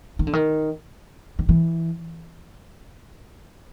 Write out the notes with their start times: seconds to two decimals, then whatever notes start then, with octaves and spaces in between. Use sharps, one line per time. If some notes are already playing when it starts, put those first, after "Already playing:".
0.19 D#3
0.27 D3
0.33 D#3
1.39 D#3
1.49 E3